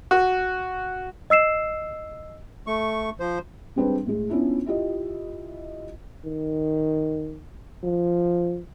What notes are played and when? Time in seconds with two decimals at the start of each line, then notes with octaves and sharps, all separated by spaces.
0.11 F#4
1.30 D#5 E6 C7 E7
2.67 A3 C#6
3.20 F3 C5
3.76 G3 G#3 C4 D4 B4
4.06 A2 G#3
4.30 B3 C#4 D4 E4 F4
4.66 E4 F4 G4 D#5
6.25 D#3
7.84 F3